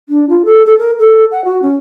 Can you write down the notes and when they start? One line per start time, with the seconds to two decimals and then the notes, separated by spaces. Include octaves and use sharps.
0.09 D4
0.29 F4
0.45 A4
0.66 A4
0.78 A#4
0.99 A4
1.32 F#5
1.45 F#4
1.62 C#4